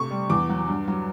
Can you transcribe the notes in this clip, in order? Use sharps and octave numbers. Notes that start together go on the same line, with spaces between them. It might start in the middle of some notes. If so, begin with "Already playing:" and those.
Already playing: C3 A3 C#6
G3
E2 D6
F#3
G2
F#3